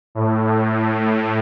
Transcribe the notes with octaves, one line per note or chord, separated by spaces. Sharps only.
A2